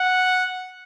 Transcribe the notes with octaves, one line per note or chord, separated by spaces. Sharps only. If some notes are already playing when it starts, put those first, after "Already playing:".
Already playing: F#5